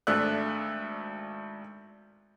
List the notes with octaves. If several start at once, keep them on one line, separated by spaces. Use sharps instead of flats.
G#1 A3 D4 E5 E6 F#6